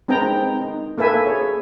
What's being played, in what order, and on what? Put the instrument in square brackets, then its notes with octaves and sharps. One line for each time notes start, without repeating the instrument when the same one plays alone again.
[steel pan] G#3 C4 D#4 B4 G5 A#5
D#4
A#3 A4 B4 E5 G#5
G#4 C#5